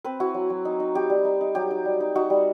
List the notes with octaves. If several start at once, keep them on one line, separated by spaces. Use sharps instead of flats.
C4 B4
E4 F#4
F#3
F#3
D#4
D#4
D#4 G4
G3
D#4
D#4
F#3 G4
D#4
G3
D#4
D#4 F#4
G3